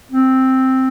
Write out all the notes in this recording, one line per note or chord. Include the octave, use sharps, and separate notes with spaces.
C4